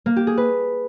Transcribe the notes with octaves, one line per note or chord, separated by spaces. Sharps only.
A#3
G4
G#4
B4